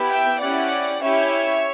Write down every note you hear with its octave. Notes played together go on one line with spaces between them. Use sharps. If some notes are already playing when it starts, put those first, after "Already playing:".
Already playing: B3 E4 G4
E5 G5
C#4 E4 G4 D5 F#5
C#4 E4 G4 C#5 E5